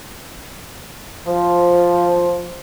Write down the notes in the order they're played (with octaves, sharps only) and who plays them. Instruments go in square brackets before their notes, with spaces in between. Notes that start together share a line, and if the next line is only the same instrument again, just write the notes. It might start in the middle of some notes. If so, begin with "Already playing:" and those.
[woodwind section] F3